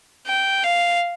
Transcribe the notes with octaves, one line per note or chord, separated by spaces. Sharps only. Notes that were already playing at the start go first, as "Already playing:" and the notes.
G5
F5